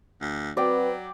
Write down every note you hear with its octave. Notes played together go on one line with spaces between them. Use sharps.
D2
F#3 C4 F#4 B4 D5 G5